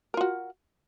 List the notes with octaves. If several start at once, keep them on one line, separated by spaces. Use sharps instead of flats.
F4 F#4 A#4